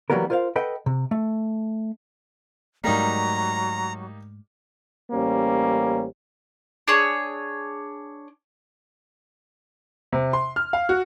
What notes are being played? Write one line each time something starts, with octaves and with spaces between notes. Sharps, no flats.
E3 F#3 G3 A#3 B3 A#4
F4 A#4 C5 C#5 F5
A4 B4 D#5 F#5 G5
C3
A3
G#2 F#3 G3 A3 A#3 D#4 A#5
A1 G3 A#3 C#4 C5
D4 G#4 C#5
C3
C6
F6
F5
F#4